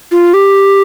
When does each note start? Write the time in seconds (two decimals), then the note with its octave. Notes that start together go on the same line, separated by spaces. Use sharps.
0.11 F4
0.34 G4